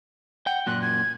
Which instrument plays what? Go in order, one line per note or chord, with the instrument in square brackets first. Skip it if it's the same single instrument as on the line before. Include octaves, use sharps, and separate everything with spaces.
[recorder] F#5 [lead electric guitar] G5
[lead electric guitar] F#2 A#2 [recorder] F#6
[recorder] G#6